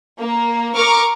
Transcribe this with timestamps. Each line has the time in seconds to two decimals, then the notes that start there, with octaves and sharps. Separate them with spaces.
0.19 A#3
0.75 A#4 C#6 D6 F6